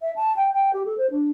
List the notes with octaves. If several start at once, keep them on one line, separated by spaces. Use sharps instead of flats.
E5
A5
G5
G5
G4
A4
C5
D4